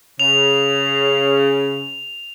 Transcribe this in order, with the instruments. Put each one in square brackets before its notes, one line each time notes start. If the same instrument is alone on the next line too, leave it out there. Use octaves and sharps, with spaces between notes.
[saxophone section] C#3 [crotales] F7